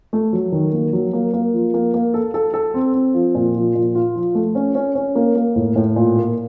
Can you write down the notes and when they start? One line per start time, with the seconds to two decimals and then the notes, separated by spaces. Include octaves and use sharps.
0.13 A3
0.33 F#3
0.52 D#3
0.73 A#3
0.93 F#3
1.13 A#3
1.33 A#3
1.53 F3
1.74 A#3
1.94 A#3
2.14 A4
2.34 A4
2.54 A4
2.74 C4
2.94 C4
3.14 F3
3.35 A#2
3.55 F3
3.75 A#2
3.95 F4
4.15 F3
4.35 A3
4.55 C#4
4.75 C#4
4.95 C#4
5.15 A#3
5.35 A#3
5.56 A2
5.76 A2
5.96 A#2
6.16 A#3